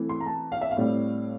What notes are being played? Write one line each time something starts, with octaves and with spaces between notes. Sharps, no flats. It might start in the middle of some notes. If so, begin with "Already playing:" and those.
Already playing: E3 A3 C4
C6
A#5
A5
F5
E5
F5
A2 G3 C4